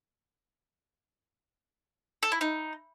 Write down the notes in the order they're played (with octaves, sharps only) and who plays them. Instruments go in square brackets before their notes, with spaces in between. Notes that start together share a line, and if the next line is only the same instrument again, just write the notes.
[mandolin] A4
E4
D#4